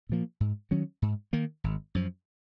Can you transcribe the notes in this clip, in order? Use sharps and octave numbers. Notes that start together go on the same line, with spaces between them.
A#2 F3 A#3
G#2
D#3 F#3 C#4
G#2
D#3 A#3
G#1
F#2 F3